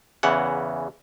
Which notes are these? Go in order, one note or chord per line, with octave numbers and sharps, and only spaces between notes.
E2 C#3 E3 F#5